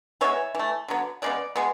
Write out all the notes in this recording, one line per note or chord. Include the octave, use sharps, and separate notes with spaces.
E3 G#3 B3 C#5 E5
E3 A3
D3 F#3 B3
C#3 G#3 B3 D5
B2 G#3 B3